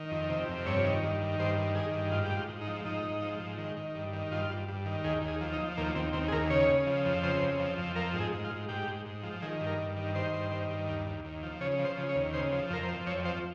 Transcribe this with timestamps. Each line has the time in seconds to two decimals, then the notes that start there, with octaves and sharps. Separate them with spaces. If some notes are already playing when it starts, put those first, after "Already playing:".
Already playing: D#3
0.11 F2
0.29 C3
0.48 F2
0.66 G2 C#5
0.84 D#3
1.03 G2
1.21 D#3
1.39 G2 C5
1.58 D#3
1.75 D#3 G#4
1.94 G2
2.12 G#2 F4
2.25 G4
2.31 G#2
2.36 F4
2.49 G#2
2.61 D#4
2.67 F3
2.85 G#2 D#4
3.03 G#2
3.22 F3
3.39 G#2
3.58 D#3
3.77 D#3
3.95 G2
4.13 D#3
4.31 G2 F4
4.50 G2
4.68 G2
4.86 D#3
5.04 D#2 G#4
5.22 D#2
5.28 G#4
5.41 F3
5.53 D#4
5.59 F3
5.77 D#2 A#3
5.95 D#2 C4
6.13 D#2 C4
6.28 G#4
6.32 D#2 A#4
6.50 C#3 C#5
6.68 C#3
6.87 F3
7.05 F2
7.23 C#3 C5
7.42 F2
7.60 F3
7.78 F2
7.96 F3 A#4
8.14 G#2
8.20 G#4
8.33 G#2
8.44 F4
8.51 G#2
8.69 G#2 G4
8.87 G#2
9.06 G#2
9.23 F3
9.42 D#3 G#4
9.60 G2
9.66 A#4
9.78 G2
9.96 D#3
10.15 D#3 C5
10.33 G2
10.51 D#3
10.70 G2
10.88 D#2
11.06 D#2
11.25 D#2
11.43 F3
11.61 C#3 C#5
11.79 F3
11.85 C5
11.98 C#3
12.09 C#5
12.15 D#2
12.33 C#3 C5
12.52 F3
12.70 F2 A#4
12.83 C5
12.88 F3
13.06 F2 C#5
13.25 F3 C5